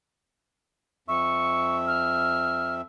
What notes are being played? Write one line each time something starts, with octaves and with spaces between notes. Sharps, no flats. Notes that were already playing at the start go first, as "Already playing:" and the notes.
F2 E5 C#6
F6